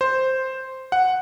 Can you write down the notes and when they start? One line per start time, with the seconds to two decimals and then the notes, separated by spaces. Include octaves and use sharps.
0.01 C5
0.92 F#5